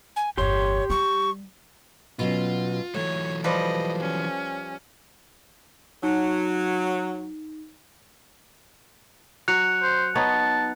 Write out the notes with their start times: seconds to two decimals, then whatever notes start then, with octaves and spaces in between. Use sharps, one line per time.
0.16 G#5
0.37 G1 E2 G4 C#5 C6
0.90 G3 C#6
2.19 B2 F#3 C#4 F4
2.94 E3 F#3 A3 C#5
3.44 F3 G3 B4 D#5
3.99 C#4
6.03 F#3 D#4
9.48 F#3 F#6 C#7 F7
9.82 C5
10.15 B3 D#4 C#5 A5